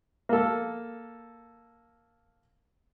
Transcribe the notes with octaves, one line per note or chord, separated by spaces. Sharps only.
A#3 A4